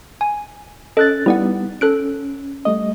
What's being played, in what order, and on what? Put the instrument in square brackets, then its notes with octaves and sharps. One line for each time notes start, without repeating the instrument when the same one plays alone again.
[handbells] G#5
[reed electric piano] C#4 F#6 A6 [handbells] A4 D#5
[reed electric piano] G3 B3 D#4 [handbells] E4 D5 F#5
[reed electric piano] C#4 [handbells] A4 F#6 D7
[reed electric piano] G3 A3 D#5